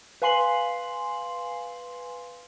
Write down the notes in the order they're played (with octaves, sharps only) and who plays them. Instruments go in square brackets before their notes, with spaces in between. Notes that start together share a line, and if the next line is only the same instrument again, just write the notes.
[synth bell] B4 F5 G#5 C6 C7 F#7